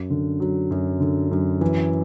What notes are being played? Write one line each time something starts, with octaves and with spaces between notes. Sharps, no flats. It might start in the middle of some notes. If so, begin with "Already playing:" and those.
Already playing: F#2
D3
F#3
F#2
D3
F#2
E3